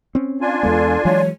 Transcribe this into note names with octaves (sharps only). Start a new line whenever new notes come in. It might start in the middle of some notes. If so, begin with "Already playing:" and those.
C4 C#4
D4 F4 G#5
E2 G#3 B3 A4
E3 F#3 G#3 C#5